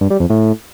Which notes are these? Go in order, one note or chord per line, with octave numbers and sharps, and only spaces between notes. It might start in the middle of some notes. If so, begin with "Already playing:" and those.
G2
G3
F2
A2